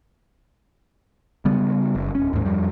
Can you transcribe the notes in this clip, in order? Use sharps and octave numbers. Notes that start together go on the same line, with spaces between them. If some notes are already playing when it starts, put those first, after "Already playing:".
C#3 G3 B3
F#1
D1 C#4
D#2 G#2
F2 G3